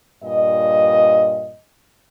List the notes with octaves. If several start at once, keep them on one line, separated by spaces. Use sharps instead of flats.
G2 A#2 D#5